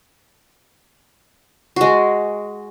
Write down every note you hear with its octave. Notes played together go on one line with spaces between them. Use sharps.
G#3 F#4